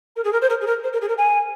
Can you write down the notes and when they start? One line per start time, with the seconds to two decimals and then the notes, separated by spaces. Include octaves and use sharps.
0.16 A#4
0.24 G#4
0.32 A#4
0.41 C5
0.49 A#4
0.60 G#4
0.66 A#4
0.83 C5
0.92 A#4
1.01 G#4
1.08 A#4
1.17 G#5